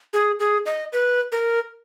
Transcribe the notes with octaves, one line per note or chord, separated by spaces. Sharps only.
G#4
G#4
D#5
B4
A#4